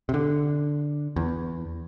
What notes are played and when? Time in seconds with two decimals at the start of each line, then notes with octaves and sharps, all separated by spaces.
0.09 C3
0.14 D3
1.16 E2